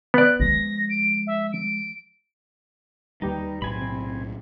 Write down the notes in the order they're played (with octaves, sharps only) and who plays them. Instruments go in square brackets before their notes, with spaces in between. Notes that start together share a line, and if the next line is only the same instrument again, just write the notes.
[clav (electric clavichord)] B3 D5 [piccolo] F#6
[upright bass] F3 G#3 [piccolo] A#6
[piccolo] D7
E5
D7
[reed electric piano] D#2 G4 B4 [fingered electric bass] G3 [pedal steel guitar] D#4
[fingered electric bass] B1 A2 F#3 [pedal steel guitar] C4 G#5 B5
[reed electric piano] C3